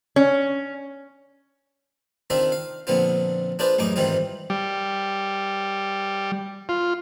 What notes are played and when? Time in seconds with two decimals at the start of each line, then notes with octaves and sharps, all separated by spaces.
0.16 C#4
2.30 D#3 C4 D4 F4 E5 F5
2.52 F5
2.87 A#1 D3 B3 C4 F4
3.59 D4 F4 G#4 B4 C5 D5
3.78 A1 F#2 D#4 G#4 D6
3.96 G#2 D#3 E3 G3 C4 F4
4.50 G3
6.69 F4